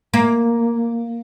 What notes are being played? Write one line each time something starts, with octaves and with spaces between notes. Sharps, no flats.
A#3